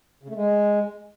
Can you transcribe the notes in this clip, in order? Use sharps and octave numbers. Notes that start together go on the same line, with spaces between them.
C#3
A3
G#3